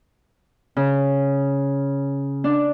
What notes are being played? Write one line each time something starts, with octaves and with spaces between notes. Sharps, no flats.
C#3
D4